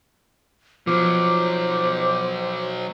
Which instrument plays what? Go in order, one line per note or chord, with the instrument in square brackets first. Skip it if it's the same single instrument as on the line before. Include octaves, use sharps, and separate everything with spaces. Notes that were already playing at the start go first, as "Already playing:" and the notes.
[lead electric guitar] B2 F#3 [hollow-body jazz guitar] F3 [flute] C5 [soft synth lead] D6